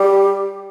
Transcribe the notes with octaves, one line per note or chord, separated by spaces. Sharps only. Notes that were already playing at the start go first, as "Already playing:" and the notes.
Already playing: G3 G4